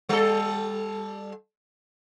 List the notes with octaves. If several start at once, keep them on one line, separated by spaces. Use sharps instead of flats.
G3 A4